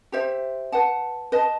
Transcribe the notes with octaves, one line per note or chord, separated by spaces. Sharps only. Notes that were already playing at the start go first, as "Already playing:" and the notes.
G4 C5 E5
B4 F#5 A5
B4 D#5 A5